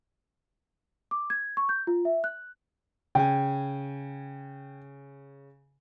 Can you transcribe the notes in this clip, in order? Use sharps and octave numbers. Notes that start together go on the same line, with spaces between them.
D6
G#6
C#6
G6
F4
E5
F#6
C#3 G5 G#5